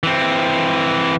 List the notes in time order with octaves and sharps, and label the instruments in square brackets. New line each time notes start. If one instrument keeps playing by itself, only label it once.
[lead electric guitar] E3 C4